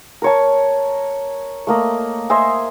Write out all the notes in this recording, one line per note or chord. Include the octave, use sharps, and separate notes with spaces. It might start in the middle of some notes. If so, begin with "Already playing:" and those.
A#4 C#5 A5
A3 A#3 D#5
C5 D#5 E5 G#5